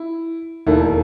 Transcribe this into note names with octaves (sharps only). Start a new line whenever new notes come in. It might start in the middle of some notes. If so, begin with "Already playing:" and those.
Already playing: E4
E1 D#2 D#3 A3 E4